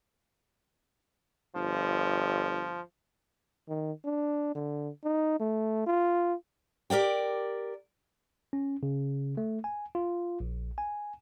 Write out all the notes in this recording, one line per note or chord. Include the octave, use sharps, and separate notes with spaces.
G1 F3
D#3
D4
D3
D#4
A3
F4
G4 A#4 D5 G5
C#4
C#3
A3
G#5
F4
A#1
G#5